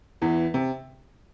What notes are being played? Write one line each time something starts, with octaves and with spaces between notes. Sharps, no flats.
E2 E3
C3